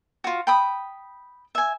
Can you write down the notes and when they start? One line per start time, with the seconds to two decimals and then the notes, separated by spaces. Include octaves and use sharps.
0.24 F4 F#4
0.47 G5 B5 D#6
1.55 E5 G#5